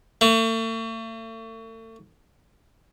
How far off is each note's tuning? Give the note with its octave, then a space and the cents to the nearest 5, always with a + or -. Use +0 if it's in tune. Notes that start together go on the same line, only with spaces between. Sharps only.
A3 +40